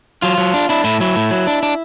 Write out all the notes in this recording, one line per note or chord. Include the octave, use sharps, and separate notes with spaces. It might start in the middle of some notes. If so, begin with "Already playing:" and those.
F#3 F4
F#3
D4
D4 E4
A2 E4
F#3 E4
A2
F#3
D4
D4